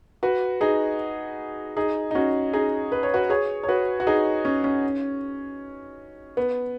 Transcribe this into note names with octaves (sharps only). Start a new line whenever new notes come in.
F#4 B4
D#4 G#4
D#4 G#4
D#4
C#4 F#4
D#4 G#4
B4
C#5
F#4 B4
G#4 C#5
C#5
F#4 B4
F#4
D#4 G#4
C#4
C#4
B3